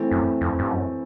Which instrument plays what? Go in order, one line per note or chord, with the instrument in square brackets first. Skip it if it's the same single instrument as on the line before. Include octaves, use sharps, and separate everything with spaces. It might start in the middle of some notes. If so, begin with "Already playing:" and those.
Already playing: [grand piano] E3 A3 C4 E4 A4
[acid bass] F#2
F2
G2
F#2